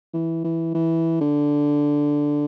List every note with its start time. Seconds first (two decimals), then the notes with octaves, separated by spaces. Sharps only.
0.14 E3
0.44 E3
0.74 E3
1.21 D3